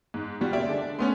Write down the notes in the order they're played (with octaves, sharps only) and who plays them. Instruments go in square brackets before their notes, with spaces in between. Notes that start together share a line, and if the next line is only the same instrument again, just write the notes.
[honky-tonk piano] G#2
[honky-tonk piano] G#2 G3 F4 [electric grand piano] F#4
[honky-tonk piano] A#2 C#3 G4 [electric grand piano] D5 E5
[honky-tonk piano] D3 G#3 D4
[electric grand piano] A3 B3 C#4 [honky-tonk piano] C6